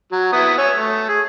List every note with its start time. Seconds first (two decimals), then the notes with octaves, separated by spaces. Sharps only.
0.12 F#3
0.33 B3 E4 D#6
0.58 C#5 G#5 E6
0.77 A3
1.09 G#4